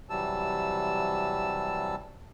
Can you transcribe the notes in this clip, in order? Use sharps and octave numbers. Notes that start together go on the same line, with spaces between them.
C3 E3 F#3 G3 A5 E6